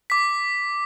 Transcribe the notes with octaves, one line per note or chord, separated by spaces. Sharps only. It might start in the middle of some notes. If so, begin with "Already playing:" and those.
D6 B6